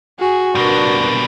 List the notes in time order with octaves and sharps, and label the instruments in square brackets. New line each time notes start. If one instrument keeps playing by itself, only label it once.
[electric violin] F#4 [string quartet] G#4
[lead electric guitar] B2 G3 [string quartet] D4 A#4 B4